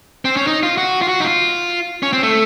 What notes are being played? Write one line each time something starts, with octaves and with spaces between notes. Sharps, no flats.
C4
C#4
D#4
F4
F#4
F4
F#4
D#4
F4
C#4
C4
A3